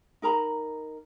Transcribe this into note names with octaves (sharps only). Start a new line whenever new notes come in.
D#4 A#4 A#5 B5